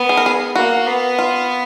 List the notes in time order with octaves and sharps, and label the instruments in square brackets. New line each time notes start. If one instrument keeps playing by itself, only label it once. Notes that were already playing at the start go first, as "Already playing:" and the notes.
Already playing: [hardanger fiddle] B3
[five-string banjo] G#4
A#4
G#4
[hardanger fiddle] A#3 [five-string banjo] F#4
[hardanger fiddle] B3
[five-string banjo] F4